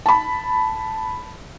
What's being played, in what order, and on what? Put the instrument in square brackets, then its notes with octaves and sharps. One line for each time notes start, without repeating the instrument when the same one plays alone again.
[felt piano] A5 B5